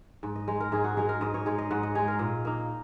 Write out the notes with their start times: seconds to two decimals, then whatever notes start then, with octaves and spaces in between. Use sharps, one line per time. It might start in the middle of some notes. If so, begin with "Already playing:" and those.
0.23 G#2
0.35 D#5
0.48 G#3 D#4 D#5
0.60 A#4
0.72 G#2 G#4
0.84 F#4
0.97 G#3 D#4 G#4
1.09 A#4
1.21 G#2 D#5
1.34 C#5
1.46 G#3 D#4 G#4
1.58 D#5
1.71 G#2 F#5
1.83 D#5
1.95 G#3 D#4 G#4
2.08 A#4
2.19 A#2 D#5
2.45 A#3 D#4